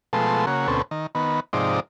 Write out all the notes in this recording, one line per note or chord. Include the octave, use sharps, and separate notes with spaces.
B2 F3 G#3 A3 A4 C6
C#3 A#3 F#4
D2 B2 C4 C#4 A4
D#3
D#3 B3
G#2 C3 F3 D#4 D5